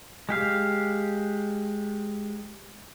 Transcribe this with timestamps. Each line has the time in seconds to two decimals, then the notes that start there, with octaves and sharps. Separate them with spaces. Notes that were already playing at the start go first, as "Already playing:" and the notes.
0.29 G#3 G4 F5